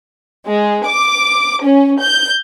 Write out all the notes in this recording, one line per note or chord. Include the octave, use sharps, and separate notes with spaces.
G#3
D6
C#4
G6